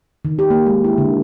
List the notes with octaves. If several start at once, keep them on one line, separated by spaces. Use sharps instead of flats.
D#3
G4
A#3
G#3
E4
D3